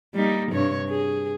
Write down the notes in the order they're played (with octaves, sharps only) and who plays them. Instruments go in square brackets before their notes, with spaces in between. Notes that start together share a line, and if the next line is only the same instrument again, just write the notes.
[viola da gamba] G3 A#3 D#4
G2 C3 C#5
G#4